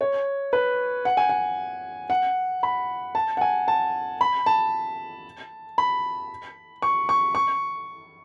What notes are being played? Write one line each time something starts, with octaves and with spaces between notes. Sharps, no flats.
C#5
B4
F#5
G#5
F#5
F#5
B5
A5
F#5
G#5
A5
B5
A5
B5
C#6
C#6
C#6